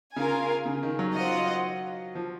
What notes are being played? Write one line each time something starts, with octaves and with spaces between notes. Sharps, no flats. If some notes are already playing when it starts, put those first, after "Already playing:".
C#3 F4 A#4 F5 G#5
C#3
D#3
F#3
F4 C5 D#5 F#5
F3